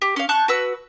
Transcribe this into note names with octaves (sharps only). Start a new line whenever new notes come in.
G4
C#4 F5
A5 C#6 F#6 G6
F#4 B4 E6